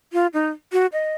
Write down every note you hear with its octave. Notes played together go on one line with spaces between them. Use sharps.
F4
D#4
F#4
D#5